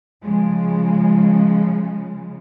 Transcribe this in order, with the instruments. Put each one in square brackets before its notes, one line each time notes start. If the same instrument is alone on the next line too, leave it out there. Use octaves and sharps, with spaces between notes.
[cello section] C#3 F3 G#3